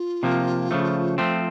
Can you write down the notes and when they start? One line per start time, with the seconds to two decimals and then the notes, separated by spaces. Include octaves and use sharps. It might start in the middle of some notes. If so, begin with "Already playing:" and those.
Already playing: F4
0.23 C3 F3 A#3
0.71 C#3 F3 A3
1.18 F3 A3 C4